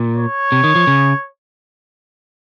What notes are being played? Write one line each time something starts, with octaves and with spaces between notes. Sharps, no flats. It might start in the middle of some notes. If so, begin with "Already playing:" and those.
Already playing: A#2
C#5
C3
D#3
F3
C#3